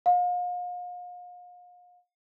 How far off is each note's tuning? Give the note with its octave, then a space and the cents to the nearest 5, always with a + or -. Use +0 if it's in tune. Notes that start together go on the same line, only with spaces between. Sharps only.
F5 +40